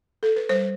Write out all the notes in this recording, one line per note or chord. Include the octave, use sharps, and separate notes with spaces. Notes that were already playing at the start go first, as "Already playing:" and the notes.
A4
B4
G3 C5